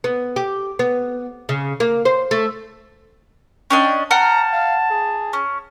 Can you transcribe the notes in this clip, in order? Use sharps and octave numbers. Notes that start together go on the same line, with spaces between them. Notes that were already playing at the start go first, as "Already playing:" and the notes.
B3
G4
B3
C#3
A#3
C5
A3
C#4 D4 D#5 G5
F#5 G5 A5 A#5 F6
F5
G#4
C#4